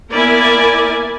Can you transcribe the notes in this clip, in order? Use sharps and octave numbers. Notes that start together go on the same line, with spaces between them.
A#3 B3 E4 A#4 D5 G#5